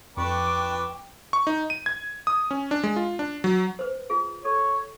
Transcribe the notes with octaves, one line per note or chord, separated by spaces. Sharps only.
F2 D4 B4 G5 C#6 D6
C#6
D#4
D#7
G#6
D#6
C#4
D4
G#3
F4
D4
F#3
B4 C5
F4 G#4
A4 C#5